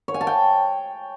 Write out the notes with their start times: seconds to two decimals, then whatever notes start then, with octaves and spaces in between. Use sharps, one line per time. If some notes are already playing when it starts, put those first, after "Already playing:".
0.08 C#5
0.14 G#5
0.21 A5
0.27 G5